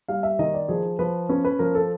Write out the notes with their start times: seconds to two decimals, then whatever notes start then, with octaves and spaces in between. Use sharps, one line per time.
0.08 G3 F5
0.23 E5
0.39 D#3 D#5
0.54 D5
0.69 F3 G#4
0.99 F3 B4
1.29 C#4 B4
1.45 B4
1.59 F3 A#4
1.75 A4